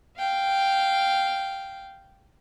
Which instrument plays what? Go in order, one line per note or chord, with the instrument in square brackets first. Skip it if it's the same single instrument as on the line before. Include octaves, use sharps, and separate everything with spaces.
[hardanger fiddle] F5 G5